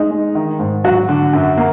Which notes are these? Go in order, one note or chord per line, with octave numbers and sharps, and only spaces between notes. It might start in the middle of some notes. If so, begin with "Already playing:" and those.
Already playing: G#3 D#4
G#3
D#3
G#2
F#3 F#4
D3
F#2
A#3